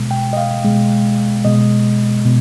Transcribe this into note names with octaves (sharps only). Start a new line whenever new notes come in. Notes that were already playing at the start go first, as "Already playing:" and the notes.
Already playing: B2 G#3
G5
D#5
F5
B2 G#3
B2 G#3 D#5
B2